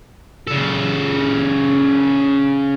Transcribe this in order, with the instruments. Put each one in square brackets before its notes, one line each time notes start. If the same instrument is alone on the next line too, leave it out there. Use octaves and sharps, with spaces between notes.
[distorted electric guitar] C#3 A4